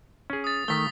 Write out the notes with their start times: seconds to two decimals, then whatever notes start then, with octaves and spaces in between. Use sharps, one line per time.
0.30 C#4 G#4
0.44 D#6 A6
0.68 D#3 A3 D#6 B6 G7